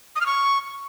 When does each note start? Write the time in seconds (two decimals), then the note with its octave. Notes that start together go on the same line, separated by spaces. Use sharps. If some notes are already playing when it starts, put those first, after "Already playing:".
0.16 D#6
0.21 F6
0.26 C#6